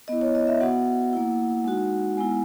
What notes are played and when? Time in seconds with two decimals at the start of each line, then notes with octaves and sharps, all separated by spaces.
0.08 B3 E4 D#5
0.21 C#5
0.35 D#5
0.47 E5
0.61 B3 F#4 F#5
1.13 A#3 E4
1.64 G#3 D#4 F#4
2.17 G#3 B3 E4 G#5